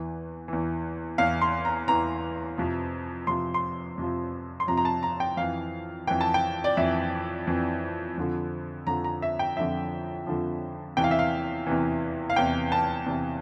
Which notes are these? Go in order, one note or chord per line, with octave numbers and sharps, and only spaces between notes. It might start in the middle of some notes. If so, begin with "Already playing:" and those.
Already playing: E2 E3
E2 E3
E2 E3 F5
C6
A#5
E2 E3 A#5
F2 C3 F3
F2 C3 F3 C6
C6
F2 C3 F3
C6
F2 C3 F3 A#5
A#5
A5
A#5
G5
F2 E3 F5
F2 E3 G5
A5
G5
D5
F2 E3 E5
F2 E3
F2 D3 F3
F2 D3 F3 A#5
A#5
E5
G5
F2 D3 F3 E5
F2 D3 F3
E2 C3 E3 G5
F5
E5
F5
E2 C3 E3
F5
E2 C3 E3 G5
A5
E2 C3 E3